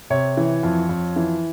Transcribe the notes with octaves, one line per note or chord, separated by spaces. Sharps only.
C3 C#5
E3
F2
F2
E3